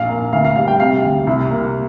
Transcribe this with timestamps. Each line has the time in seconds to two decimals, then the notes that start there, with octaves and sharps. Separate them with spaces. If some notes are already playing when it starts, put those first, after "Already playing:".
Already playing: A#1 F5
0.09 A#3
0.32 D2 F5
0.45 F5
0.56 G3 F5
0.68 G5
0.80 C3 F5
1.04 D2
1.27 C2
1.51 A#3